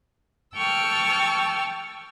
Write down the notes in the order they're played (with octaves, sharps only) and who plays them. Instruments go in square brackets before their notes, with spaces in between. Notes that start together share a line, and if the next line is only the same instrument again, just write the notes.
[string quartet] G5 A5 C#6 E6 F6